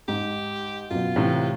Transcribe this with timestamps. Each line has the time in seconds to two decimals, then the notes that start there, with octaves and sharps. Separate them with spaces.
0.08 G#2 G4
0.91 F#2 B2 F4
1.16 A2 C3 E3